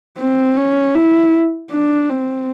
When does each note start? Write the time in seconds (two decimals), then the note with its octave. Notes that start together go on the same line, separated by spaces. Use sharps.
0.19 C4
0.57 C#4
0.95 E4
1.71 D4
2.09 C4